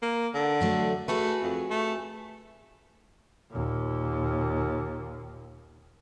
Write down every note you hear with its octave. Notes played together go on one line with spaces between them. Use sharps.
A#3
D3
F#3 A3 D4
A3 F#4 G#4 B4
F2
A3
D#2 A#2